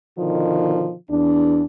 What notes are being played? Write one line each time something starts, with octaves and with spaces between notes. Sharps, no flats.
B2 D3 D#3 F3
E2 D4